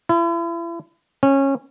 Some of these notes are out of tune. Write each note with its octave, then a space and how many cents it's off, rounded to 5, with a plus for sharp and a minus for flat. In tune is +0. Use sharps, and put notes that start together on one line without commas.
E4 +40
C#4 -20